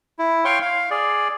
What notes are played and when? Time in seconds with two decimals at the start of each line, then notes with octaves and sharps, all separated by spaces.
0.19 E4
0.45 C#5 F5 G5 C6 C#6
0.62 F5
0.91 G#4 D5